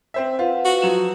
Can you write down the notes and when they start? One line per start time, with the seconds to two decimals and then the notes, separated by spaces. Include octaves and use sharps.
0.14 C4 C5 E5
0.39 F4 B4 F5 F#5
0.65 F#4
0.82 F3 F#3 E7